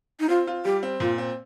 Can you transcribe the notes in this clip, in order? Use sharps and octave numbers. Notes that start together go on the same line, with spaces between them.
D#4
C4 F4
F4
G3 G4
C4
A#2 F4
C4